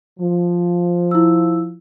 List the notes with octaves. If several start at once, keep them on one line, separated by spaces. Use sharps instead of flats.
F3
E4 E6